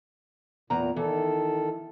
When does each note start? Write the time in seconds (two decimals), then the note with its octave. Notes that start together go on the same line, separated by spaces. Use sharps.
0.70 E2 A#2 A#5
0.96 D#3 E3 A4